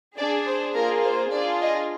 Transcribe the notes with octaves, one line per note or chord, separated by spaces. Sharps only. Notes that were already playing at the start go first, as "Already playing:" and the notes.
D4 G#4 D5
C5
A#3 F4 G#4 A#4
C5
D4 F4 G#4 D5
D#5